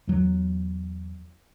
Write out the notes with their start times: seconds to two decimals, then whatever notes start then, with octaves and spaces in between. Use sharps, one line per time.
0.07 E2 F#3